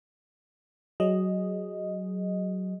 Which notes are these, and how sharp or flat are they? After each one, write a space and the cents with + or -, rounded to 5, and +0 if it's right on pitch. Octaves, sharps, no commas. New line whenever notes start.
F#3 +15 G#4 +0 D#5 +0